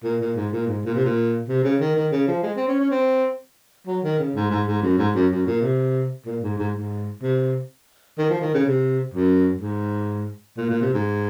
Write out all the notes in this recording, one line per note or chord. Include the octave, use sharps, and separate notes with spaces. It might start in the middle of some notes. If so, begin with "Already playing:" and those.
A#2
A#2
G#2
A#2
G#2
A#2
C3
A#2
C3
C#3
D#3
D#3
C#3
F3
G#3
C4
C#4
C#4
C4
F#3
D#3
C#3
G#2
G#2
G#2
F#2
G#2
F#2
F#2
A#2
C3
A#2
G#2
G#2
G#2
C3
D#3
F3
D#3
C#3
C3
F#2
G#2
A#2
A#2
C3
G#2